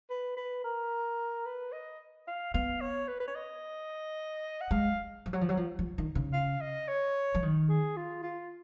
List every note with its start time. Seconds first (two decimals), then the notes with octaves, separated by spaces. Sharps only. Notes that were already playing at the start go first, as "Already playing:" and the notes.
0.10 B4
0.37 B4
0.64 A#4
1.46 B4
1.72 D#5
2.27 F5
2.54 B3 F5
2.81 C#5
3.08 B4
3.20 B4
3.28 C#5
3.35 D#5
4.61 F#5
4.71 G#3 F5
5.26 F3
5.33 F#3
5.41 F3
5.49 F#3
5.57 F3
5.79 F3
5.98 D#3
6.15 C#3
6.33 F5
6.61 D#5
6.88 C#5
7.35 F3
7.43 D#3
7.69 G#4
7.97 F4
8.23 F4